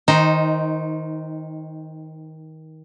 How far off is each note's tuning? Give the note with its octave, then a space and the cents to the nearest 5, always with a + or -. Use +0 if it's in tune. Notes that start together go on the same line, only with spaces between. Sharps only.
D#3 +25 D#4 +0 C5 +0